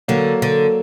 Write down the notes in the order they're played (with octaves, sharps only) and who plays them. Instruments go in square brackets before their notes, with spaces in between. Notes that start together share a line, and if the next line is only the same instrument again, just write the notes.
[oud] D3 [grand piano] F#3 A#3
[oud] D3